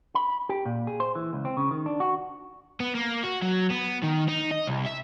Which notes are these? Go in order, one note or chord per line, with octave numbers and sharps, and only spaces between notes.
B5
G4
A#2
G#4
C5
E3
C#2
C4
C#3
D#3
D4
F#4
B3
A#3
F#4
F#3
B3
D#3
D#4
D#5
C2
E5